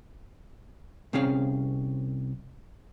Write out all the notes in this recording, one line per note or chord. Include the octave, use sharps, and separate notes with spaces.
C2 C4 C#4 G#4 F5